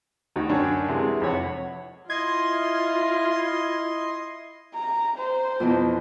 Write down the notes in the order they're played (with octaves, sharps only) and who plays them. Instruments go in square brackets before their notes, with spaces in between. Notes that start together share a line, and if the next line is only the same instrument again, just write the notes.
[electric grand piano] D2 [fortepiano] D#4 F#4 G5
[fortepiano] F#2 [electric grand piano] D4 C#5
[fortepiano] C3 E3 G#3
[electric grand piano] F2 [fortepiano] E3 C#5 F#5
[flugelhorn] E4 [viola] F4 [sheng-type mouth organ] D#5 C6 [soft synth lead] G#6
[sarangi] A#5
C5
[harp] F2 B2 E3